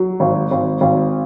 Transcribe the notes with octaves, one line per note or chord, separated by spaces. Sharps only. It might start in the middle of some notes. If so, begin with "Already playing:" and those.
Already playing: F#3
G#1
G#1
G#1